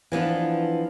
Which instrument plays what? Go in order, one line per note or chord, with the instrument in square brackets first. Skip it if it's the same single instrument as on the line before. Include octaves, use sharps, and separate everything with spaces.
[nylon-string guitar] E3 F3 B3 D4